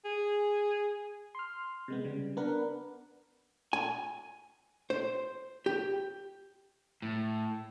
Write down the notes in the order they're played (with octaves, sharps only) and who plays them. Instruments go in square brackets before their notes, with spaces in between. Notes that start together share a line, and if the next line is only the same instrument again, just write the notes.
[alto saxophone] G#4
[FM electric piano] C6 F6
C3 G#3 B3
C#3 G3
B3 D4 A#4 B4 F#5
[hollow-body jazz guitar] G#5
C5
G4
[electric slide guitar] A2